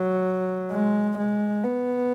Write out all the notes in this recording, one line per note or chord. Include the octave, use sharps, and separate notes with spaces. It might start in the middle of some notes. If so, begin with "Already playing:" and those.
Already playing: F#3
G#3
G#3
B3